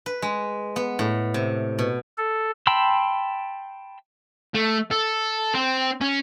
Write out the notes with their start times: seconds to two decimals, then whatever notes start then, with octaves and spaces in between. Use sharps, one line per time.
0.06 B4
0.22 G#3
0.76 B3
0.99 A2
1.34 C3
1.79 B2
2.18 A4
2.67 G5 A5 B5 C6 E6
4.54 A3
4.91 A4
5.55 C4
6.01 C#4